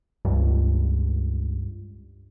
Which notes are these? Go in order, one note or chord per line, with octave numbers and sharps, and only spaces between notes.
C#2 G2